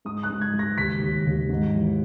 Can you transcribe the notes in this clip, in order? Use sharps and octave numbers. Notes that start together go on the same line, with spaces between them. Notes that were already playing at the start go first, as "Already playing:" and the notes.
G#2 D#6
F#6
G#2
G#6
G#2
A#6
D#2 B6
D#2
D#2
G#2
E3